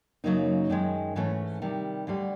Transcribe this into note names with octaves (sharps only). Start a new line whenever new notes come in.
F#2 C#3 F#3 A#3 D#4
F#2 D#3 G#3
G#2 E3 A3 C#4
C3 D#3 G3
D2 D3 G3